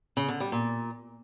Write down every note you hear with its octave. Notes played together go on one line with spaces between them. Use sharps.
C#3
D3
G3
A#2